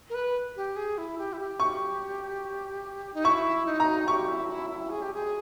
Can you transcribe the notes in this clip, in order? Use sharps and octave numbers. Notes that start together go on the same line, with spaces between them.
A#4
B4
G4
G#4
E4
G4
E4
G4
C#6
D#4
E4 C#6
D#4
A#5
G4 C#6
E4
E4
E4
G#4
G4
G#4